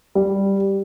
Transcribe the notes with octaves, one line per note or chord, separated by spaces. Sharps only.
G3